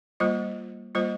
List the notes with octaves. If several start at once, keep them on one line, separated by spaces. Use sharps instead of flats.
G3 A#3 F4 C5 D#5
G3 A#3 F4 C5 D#5